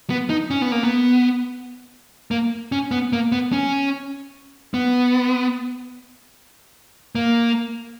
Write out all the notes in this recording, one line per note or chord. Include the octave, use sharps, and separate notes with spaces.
B3
D#4
C#4
B3
A#3
B3
A#3
C#4
B3
A#3
B3
C#4
B3
A#3